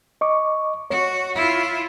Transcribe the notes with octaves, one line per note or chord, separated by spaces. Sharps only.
D#5 C#6 D6
F#4 C#5
E4 F4